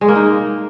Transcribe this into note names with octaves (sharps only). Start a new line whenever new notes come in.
G#3
A#3
D#4